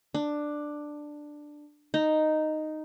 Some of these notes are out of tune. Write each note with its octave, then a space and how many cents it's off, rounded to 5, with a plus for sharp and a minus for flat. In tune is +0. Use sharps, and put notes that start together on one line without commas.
D4 +10
D#4 -5